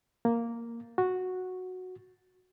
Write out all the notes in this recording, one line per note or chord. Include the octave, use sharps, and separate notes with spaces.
A#3
F#4